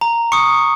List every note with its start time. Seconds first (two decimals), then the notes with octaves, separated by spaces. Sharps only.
0.01 A#5
0.32 C#6 D#6 C#7